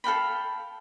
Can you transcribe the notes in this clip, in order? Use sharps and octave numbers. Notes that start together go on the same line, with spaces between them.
A4 F5 G5 B5